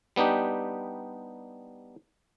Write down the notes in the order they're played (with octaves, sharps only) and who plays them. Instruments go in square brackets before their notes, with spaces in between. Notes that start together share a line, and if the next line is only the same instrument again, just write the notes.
[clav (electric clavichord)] G3 B3 D4 D#4 G4